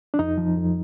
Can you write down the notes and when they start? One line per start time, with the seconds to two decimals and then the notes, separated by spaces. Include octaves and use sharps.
0.14 D4
0.19 F2 D#4
0.38 F3
0.57 F2